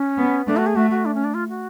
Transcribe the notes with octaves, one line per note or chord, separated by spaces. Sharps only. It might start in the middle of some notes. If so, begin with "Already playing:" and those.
Already playing: C#4
B3
A3 D4
F#4
G#4
A3 F#4
F#4
D4
C#4
D4
F4
F#4